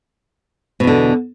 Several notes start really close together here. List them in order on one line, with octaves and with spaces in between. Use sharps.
B2 E2 D3